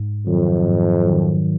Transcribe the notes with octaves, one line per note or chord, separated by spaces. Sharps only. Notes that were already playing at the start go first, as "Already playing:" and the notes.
Already playing: G#2
F2 D#3 F#3
G#2
D#3 F#3